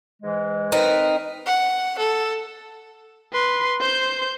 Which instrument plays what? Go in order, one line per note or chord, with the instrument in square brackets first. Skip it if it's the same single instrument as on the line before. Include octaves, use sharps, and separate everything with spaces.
[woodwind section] G#2 E3 G#3
[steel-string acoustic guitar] C4 D#4 A#4 [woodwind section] B4
[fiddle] F#5
A4
[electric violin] B4 C6
C5 G6